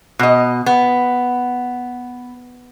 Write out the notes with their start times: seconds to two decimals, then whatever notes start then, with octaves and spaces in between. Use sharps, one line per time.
0.19 B2 D#5
0.66 B3